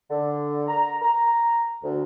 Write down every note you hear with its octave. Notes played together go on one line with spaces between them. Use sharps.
D3
A#5
A#5
D2